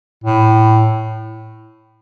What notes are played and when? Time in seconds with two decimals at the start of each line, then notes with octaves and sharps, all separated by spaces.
0.24 A2